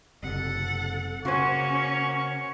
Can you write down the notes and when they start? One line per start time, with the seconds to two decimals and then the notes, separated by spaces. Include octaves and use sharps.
0.23 F#1 C3 A4 F#5
1.25 C#3 A#3 C#4 F#4 C5 C#5 G#5 C#6